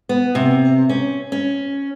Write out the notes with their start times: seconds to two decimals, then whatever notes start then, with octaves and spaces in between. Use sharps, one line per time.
0.09 B3
0.35 C3
0.89 C#4
1.32 C#4